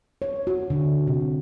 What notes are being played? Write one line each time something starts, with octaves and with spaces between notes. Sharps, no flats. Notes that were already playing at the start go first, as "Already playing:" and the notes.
C#5
F#4
D3
C3